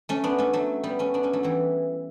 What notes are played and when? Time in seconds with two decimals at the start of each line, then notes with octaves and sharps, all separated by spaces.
0.09 A3 C#4
0.24 B3 D4
0.38 A3 C#4
0.53 F#3 A3
0.83 G3 B3
0.99 A3 C#4
1.14 B3 D4
1.23 A3 C#4
1.33 F#3 A3
1.43 E3 G3